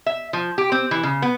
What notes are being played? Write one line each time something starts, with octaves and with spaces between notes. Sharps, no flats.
E5
F3
G4
C4
E3
C#3
B3